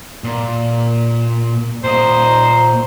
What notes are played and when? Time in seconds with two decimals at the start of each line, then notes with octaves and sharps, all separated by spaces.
0.24 A#2
1.84 A#2 C5 D#5 A#5